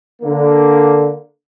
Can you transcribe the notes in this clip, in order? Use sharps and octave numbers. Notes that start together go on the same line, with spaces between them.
D3 A#3